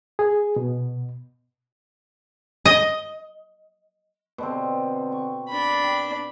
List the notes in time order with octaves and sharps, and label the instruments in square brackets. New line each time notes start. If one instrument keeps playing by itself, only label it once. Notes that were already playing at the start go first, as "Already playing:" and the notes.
[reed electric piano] G#4
B2
[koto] D#5
[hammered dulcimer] B2 D3 C4
C#6
[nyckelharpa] D4 B5
[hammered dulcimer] G5